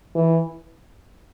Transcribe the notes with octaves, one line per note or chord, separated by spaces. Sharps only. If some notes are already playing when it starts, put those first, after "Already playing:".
E3